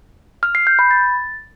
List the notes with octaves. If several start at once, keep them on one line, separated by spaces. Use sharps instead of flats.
F6
C7
G6
B5
A6